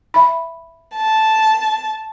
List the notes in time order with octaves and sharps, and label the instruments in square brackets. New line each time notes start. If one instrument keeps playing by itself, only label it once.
[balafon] E5 B5
[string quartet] A5